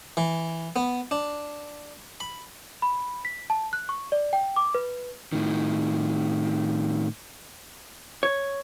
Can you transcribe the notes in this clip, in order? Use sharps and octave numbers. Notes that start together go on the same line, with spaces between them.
E3
B3
D4
B5
B5
B6
A5
F#6
C#6
D5
G5
D6
B4
A2 D#3
C#5